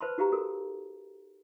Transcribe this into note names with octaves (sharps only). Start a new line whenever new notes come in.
B4 C5 A5 B5 C6
D#4 F#4 G4 F5 A#5
F#4 A4 A#4